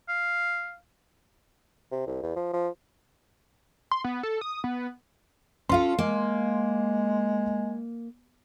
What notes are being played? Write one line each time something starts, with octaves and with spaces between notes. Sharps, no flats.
F5
C3
C2
E2
F3
F3
C6
B3
A4
D#6
B3
C#4 F4 A4 F5 C6
G#3 A#3